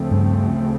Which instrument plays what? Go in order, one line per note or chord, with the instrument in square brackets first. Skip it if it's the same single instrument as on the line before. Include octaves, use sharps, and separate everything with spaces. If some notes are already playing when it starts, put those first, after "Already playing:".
Already playing: [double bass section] D2 C#3 F3 A3 C4
[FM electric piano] G2